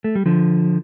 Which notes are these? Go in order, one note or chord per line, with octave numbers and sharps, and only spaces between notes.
A3
G3
D3 F3